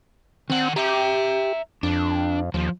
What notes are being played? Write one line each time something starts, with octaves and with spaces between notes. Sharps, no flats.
D#3 C4 F#5
G4 E5 A#5
F2 D4
D#2 F3